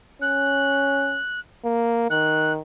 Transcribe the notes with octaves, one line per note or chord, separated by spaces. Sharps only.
C#4 F#6
A#3
D#3 F#6